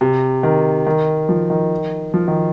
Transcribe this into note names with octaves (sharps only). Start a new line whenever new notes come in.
C3
D#3
D#3
F3
D#3
F3
D#3